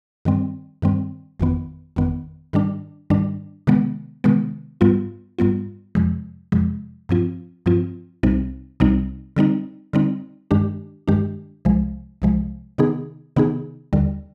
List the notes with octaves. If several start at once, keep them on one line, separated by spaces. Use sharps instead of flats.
G2 D#3 G3 C4
G2 D#3 G3 C4
G1 F2 D#3 B3
G1 F2 D#3 B3
G#2 D#3 G3 D4
G#2 D#3 G3 D4
C3 D#3 G#3 B3
C3 D#3 G#3 B3
G#2 G3 B3 F4
G#2 G3 B3 F4
F2 C3 F3 G#3
F2 C3 F3 G#3
G2 F3 C4 F4
G2 F3 C4 F4
C2 C3 G3 C4 D#4
C2 C3 G3 C4 D#4
D3 G3 C4 D#4
D3 G3 C4 D#4
G2 D#3 G#3 D4 G4
G2 D#3 G#3 D4 G4
C2 C3 F3 G#3
C2 C3 F3 G#3
C3 D#3 B3 D#4 G#4
C3 D#3 B3 D#4 G#4
D#2 D3 G3